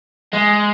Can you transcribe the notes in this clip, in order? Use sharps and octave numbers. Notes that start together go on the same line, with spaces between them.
G#3